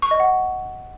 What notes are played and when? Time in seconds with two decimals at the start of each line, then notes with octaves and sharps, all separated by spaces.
0.02 C#6
0.11 D#5
0.20 F#5